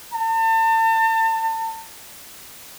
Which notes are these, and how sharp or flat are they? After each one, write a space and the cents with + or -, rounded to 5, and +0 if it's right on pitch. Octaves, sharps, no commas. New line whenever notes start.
A5 +35